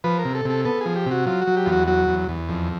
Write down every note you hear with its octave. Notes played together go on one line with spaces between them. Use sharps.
F3 B4
A#4
C3
A4
C3 A4
B3 A4
F3 G#4
G4
C3 F#4
F#3 F4
F#4
F#3
G4
E2 F4
F#4
F#3 F#4
E2
E2
F2